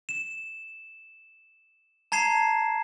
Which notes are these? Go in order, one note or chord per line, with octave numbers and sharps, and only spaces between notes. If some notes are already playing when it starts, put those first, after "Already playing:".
E7
A5 A#5 G#6 C7 E7